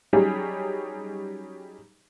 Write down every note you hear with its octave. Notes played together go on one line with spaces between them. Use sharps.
F#3 G3 C#4 D#4 G4 G#4